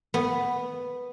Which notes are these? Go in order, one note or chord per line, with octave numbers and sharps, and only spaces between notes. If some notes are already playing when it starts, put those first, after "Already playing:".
B3